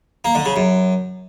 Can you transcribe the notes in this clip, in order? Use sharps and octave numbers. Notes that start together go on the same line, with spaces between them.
A#3
D3
C#3
F#2